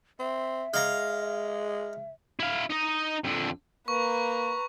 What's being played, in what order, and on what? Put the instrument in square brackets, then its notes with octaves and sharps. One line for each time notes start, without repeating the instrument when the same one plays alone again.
[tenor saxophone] C4 [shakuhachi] E5
[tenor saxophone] G#3 [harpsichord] F5 A#5
[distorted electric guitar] E4 F5
D#4 D#5
F2 D3
[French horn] A#3 [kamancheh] B4 A#5 [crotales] C#6